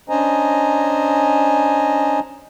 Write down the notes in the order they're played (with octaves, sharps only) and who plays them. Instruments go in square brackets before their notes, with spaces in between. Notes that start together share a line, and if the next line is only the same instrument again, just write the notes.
[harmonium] C#4 D4 C5 D#5 G#5 A#5